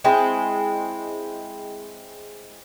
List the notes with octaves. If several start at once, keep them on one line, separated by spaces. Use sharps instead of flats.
G#3 C4 E4